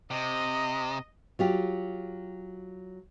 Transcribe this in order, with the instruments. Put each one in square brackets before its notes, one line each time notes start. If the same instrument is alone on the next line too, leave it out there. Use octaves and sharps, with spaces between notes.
[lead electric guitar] C3 [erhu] D#5
[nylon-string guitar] F#3 F4 G4